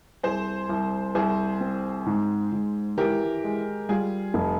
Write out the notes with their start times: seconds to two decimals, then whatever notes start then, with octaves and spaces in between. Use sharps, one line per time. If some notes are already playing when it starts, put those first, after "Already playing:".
0.23 C2 G#4 C5
0.69 C2
1.15 C2 G#4 C5
1.61 C4
2.06 G#2
2.52 G#2
2.97 E3 G4 A#4
3.44 G#3
3.89 G3 F4 G#4
4.34 F1